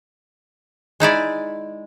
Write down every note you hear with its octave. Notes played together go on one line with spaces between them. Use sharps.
G#3 D#4 E4 D5